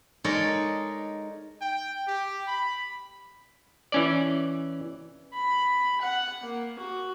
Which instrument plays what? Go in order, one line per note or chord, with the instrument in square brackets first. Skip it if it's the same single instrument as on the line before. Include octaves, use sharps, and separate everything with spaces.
[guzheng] G#3 D#4 A4 A#4 C#5 D5
[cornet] G5
G4
B5
[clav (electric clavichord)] E3 C#4 D5
[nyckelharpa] B5
F#5
A#3
F#4